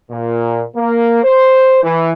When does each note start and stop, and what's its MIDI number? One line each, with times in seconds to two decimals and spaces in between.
0.10 0.63 46
0.76 1.23 58
1.23 1.80 72
1.83 2.13 52